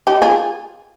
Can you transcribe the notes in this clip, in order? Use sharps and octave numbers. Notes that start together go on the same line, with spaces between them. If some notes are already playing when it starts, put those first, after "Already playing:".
D#4 G4
F4 G#4